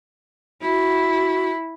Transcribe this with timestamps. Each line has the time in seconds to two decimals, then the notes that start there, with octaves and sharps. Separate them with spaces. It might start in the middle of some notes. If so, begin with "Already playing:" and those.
0.62 E4 F#4